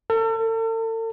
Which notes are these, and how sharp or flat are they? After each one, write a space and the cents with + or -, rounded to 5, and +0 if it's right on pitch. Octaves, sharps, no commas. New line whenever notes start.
A4 +40